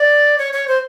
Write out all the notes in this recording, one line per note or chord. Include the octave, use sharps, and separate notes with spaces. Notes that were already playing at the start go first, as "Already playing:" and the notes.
Already playing: D5
C#5
C#5
C5